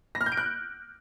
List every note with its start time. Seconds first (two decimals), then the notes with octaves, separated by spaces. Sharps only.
0.15 A#6
0.21 F6
0.26 G6
0.32 D7
0.37 F#6